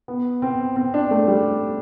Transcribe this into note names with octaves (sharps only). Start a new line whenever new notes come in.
B3
C4
C4
D4
A3
G3